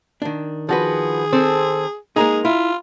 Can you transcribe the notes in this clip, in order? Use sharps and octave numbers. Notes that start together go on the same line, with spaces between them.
D#3 D4
F3 F#4 G#4 B4
C4 A4 C5
G#3 A#3 D#4 G#4 A#5
E4 F4